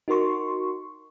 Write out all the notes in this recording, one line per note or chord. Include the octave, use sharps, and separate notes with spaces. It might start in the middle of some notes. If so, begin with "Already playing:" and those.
D#4 F#4 A#4 C6 C#6